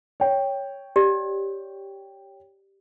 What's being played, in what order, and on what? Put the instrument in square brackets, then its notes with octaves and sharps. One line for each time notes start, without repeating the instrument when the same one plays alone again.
[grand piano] C#5 G5
[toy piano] G4 D5 D#5